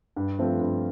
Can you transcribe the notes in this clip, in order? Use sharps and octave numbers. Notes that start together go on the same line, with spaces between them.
G2
F3 A3 C4 F4
G2